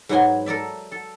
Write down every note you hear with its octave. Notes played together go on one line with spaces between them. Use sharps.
G#2 F#3 B3 D#5 G#5 C6
A4 A#4 D5 E5
A4